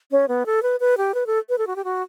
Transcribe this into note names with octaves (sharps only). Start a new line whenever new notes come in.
C#4
B3
A4
B4
B4
G4
B4
A4
B4
A4
F#4
G4
F#4